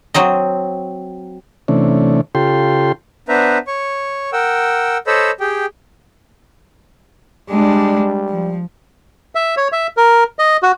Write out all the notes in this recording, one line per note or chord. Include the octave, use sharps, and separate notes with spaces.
F#3 C4 D#5
C3 E3 A3 C#4 D4
C#3 F4 G4 A4 G5 C6
B3 D4 B4 C5 E5 A#5
C#5 C#6
A#4 F#5 G5 E6
A4 C5 C#5 D#5 B5 E6
G4 G#4 G5
G3 G#3 D4
F3
E5
C#5
E5
A#4
D#5
F#4